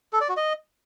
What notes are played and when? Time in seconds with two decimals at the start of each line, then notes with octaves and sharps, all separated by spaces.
0.13 A4
0.21 D5
0.29 F#4
0.37 D#5